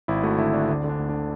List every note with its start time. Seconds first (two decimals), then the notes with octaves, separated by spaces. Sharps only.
0.08 G#1 E4
0.23 A3 F#4
0.38 D3 E4
0.53 D3 D4
0.69 D2 D4
0.84 D3
0.89 D4
0.99 D2
1.09 D4